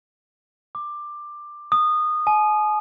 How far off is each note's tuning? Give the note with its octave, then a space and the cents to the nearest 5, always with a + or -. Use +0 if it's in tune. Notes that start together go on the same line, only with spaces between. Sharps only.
D6 +15
D#6 -20
G#5 +40